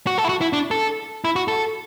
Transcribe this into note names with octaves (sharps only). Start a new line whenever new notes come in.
F#4
A4
E4
F#4
E4
D4
A4
E4
F#4
A4